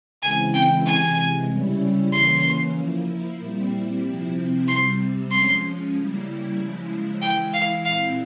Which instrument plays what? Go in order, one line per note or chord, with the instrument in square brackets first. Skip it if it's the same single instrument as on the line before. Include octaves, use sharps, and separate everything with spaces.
[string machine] C#3 E3 G#3 C4 E4 [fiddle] G#5
[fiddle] G5
[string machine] C3 E3 G#3 [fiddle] G#5
[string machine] C#3 G3 C#4 E4
[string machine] C#3 E3 A#3 C#4 [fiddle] C6
[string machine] F3 A#3 E4
A#2 G3 C4 E4
C3 F3 C4 E4
[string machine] C3 G3 C4 [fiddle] C6
[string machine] F3 G#3 C#4 [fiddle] C6
[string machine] C#3 G3 A#3 E4
C#3 F3 G#3 E4
[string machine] E3 G#3 E4 [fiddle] G5
[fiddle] F5
[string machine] A#2 G#3 C4 E4 [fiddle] F5